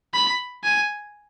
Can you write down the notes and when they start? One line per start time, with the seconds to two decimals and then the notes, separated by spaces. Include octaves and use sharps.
0.14 B5
0.64 G#5